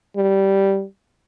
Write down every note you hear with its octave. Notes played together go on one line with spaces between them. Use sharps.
G3